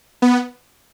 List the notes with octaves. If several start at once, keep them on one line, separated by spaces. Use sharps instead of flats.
B3